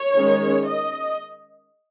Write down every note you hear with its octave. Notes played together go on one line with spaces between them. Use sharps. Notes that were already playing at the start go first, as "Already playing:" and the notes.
Already playing: C#5
D#3 G#3 C#4
D#5